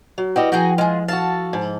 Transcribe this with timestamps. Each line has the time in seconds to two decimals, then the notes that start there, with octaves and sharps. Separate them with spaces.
0.18 F#3
0.36 G3 E4 F#4 B4 D#5 G5
0.52 F3 F#4 G#4 G5 G#5 A#5
0.78 G#3 F4 G#4
1.08 F#4 A4 F5 A5
1.53 G#2 C5